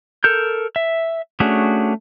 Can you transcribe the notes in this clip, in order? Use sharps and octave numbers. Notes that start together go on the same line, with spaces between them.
A4 A#4 G6
E5
A3 C#4 D4 F#4 G#4